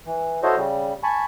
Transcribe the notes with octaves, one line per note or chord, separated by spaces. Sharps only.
E3
E4 F#4 A4 C5 C#5 D#5
C#3 G3
G#5 A5 B5 C#6